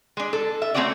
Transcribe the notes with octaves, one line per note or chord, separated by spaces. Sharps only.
G#3 D4
A4
E5
A3 A#3 C4 C#4 F#4 D5